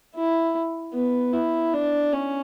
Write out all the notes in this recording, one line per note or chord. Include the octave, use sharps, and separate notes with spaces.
E4
B3
E4
D4
C#4